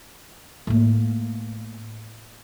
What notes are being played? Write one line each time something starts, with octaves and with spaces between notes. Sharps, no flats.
A2 A#3